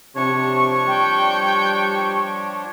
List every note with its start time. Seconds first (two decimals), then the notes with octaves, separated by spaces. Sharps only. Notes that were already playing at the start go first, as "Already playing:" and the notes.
0.16 C3 F3 D4 C#5 C#6
0.87 G3 G5